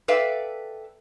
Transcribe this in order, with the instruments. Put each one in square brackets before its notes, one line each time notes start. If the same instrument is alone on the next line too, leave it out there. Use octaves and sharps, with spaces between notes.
[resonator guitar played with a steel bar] A4 B4 D5 E5 F5 G5